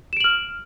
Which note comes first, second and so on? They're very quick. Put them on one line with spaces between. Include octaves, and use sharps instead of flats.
E7 D7 F#7 F6